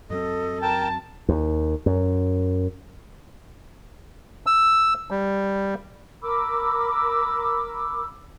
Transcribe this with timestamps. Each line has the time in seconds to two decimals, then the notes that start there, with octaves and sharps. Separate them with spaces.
0.10 F#2 F#3 C4 A4 D#5
0.62 A#4 G5 A5
1.29 D#2
1.86 F#2
4.46 E6
5.11 G3
6.22 A#4 B5 D6 E6